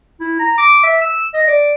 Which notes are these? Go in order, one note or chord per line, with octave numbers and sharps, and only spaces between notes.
E4
A#5
D6
E5
E6
D#5
D5